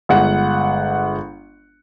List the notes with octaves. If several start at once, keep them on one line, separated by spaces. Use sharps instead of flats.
G1 G#3 F#5